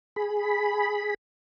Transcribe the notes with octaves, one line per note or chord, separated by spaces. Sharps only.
G#4 B5